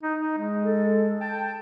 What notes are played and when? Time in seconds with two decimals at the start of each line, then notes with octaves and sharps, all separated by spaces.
0.03 D#4
0.19 D#4
0.38 G#3
0.65 A4
1.20 G5 A5